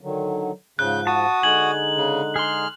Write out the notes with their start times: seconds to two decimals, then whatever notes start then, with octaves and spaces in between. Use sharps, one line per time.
0.01 D3 D#3 F#3
0.79 G#2 C#3 F3 F#6 G6
1.07 F#4 A5 D#6
1.43 D3 G#3 D#4 G#5 F#7
1.97 C#3
2.36 G#4 C6 F6